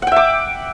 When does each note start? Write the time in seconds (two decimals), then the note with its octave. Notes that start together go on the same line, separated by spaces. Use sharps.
0.02 F#5
0.07 G5
0.12 E5
0.16 D6